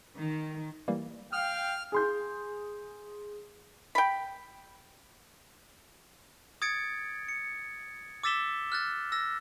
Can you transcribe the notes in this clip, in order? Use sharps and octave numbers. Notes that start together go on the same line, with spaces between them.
D#3
E3 G3 A#3
F5 G5 D#6 F6 F#6
G#4 C6 G6
G5 B5
D#6 G#6 A6 C#7 D7
C#7
D6 E6 A6 B6 E7 G7
F6 F#6 A6
E6 A#6